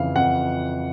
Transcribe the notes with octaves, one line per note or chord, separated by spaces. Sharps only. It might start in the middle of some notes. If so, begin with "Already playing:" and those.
Already playing: F2 C#3 E3 F5
F2 F#5